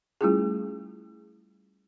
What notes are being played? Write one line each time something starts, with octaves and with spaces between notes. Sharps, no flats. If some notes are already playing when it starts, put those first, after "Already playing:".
G3 A3 C#4 E4 F4 G#4